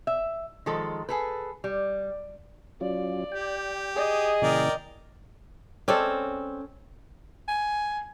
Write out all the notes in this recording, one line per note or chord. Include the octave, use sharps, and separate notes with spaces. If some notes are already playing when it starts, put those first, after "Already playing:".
E5
D#3 F3 G#3 A4
G#4 A4 B4
G3
F#3 C#4 F4 D5
G4 G5
G#4 D#5
A#2 C#3 E3 A#4 D5 G5
G#3 C4 C#4 A4 D5
G#5